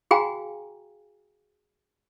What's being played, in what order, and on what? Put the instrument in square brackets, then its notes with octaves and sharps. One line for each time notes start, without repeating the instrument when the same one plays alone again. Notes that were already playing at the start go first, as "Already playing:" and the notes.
[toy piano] F#4 G#4 F5 G5 G#5 A#5